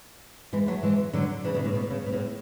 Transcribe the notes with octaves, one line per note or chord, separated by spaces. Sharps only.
E3 G#3
F#3 A3
E3 G#3
D3 F#3
C#3 E3
B2 D3
A2
B2
C#3
B2
A2